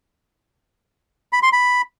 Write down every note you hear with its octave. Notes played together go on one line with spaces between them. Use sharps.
B5
C6
B5